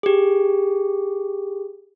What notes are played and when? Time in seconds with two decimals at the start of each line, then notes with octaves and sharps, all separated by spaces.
0.03 G4 G#4